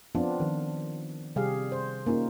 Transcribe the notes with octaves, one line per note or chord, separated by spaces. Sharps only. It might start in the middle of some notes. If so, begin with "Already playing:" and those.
F3 B3 C4 D4 F4
D#3 F3
C3 G3 G4 G#4 F5
C5
A#3 C#4 D#4 F4